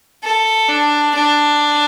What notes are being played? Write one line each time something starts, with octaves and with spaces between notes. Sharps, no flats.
A4
D4
D4